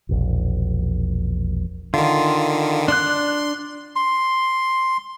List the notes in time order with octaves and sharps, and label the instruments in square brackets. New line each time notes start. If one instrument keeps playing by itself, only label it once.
[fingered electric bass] E1 A#1
[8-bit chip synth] D3 D#3 [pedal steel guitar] F4
[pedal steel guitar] D4 D5 F#6 [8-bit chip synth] C6
[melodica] C6